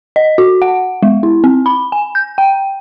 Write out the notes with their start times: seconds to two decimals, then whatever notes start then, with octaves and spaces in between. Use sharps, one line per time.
0.16 D#5
0.38 F#4
0.62 F#5
1.03 G#3
1.23 E4
1.44 C4
1.66 B5
1.92 G#5
2.15 G6
2.38 G5